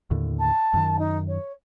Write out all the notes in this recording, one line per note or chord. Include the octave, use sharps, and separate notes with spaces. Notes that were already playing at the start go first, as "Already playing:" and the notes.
D#2 A2 D3
A5
F#2 D#3
D#4
C#5